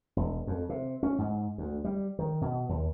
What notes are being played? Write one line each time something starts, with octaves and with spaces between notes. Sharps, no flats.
E1
F2
C3
C#4
G#2
D2
G3
D#3
B2
D#2